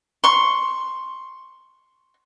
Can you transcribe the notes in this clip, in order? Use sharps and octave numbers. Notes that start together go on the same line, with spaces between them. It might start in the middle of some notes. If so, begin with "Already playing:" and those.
C6 C#6